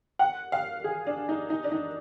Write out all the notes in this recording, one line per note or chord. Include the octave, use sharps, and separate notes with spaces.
F#5
F5
G#4
D4
D#4
D#4
D4
D#4